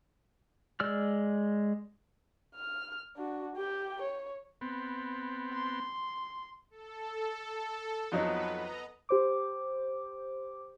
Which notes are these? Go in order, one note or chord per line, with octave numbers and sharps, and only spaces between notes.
G#3 D5 E6 F6
F6
D4 F#4
G4 G5
C#5
B3 C4
C6
A4
F2 F#3 B3 D#4 B4
D#5 A#5
G4 C5 D6